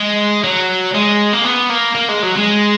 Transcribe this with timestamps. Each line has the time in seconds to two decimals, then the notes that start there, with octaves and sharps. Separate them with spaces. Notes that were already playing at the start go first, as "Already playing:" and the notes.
Already playing: G#3
0.44 F#3
0.95 G#3
1.33 A#3
1.44 B3
1.70 A#3
1.95 A#3
2.08 G#3
2.23 F#3
2.36 G#3